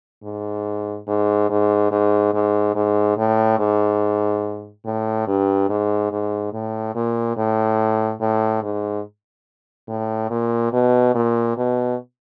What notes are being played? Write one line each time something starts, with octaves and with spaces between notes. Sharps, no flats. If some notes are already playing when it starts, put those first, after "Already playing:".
G#2
G#2
G#2
G#2
G#2
G#2
A2
G#2
A2
G2
G#2
G#2
A2
A#2
A2
A2
G#2
A2
A#2
B2
A#2
B2